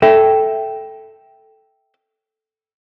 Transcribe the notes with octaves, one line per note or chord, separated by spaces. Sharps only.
A4 E5 G5